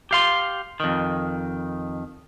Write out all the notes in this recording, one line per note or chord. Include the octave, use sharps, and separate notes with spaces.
G4 F5 C6
F2 D#3